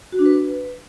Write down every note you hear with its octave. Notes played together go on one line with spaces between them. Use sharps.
F#4
D4
B4